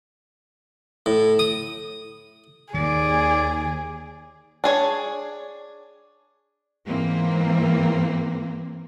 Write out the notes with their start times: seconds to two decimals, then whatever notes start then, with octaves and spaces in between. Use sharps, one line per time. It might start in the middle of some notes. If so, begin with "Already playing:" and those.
1.06 A2
1.39 D#6
2.74 D#2 D#3 G#4 D5
4.64 D4 G#4 C#5
6.86 G#2 E3 A#3 C4